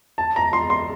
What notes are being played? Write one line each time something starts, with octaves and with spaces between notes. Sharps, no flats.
A5
A#5
C6
C6